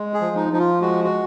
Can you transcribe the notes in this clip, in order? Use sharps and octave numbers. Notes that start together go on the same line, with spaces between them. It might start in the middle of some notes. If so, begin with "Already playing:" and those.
Already playing: G#3
G#4
F3
D#4
F3 D#4
F4
G#3 F#4
F#4